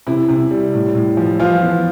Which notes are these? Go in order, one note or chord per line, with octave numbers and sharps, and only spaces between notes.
C3 E4
C3
G3
A2
A2
F3
E3 F3 F4
B3